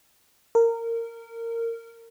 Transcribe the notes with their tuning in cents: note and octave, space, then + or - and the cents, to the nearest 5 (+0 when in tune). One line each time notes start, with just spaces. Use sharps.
A#4 -20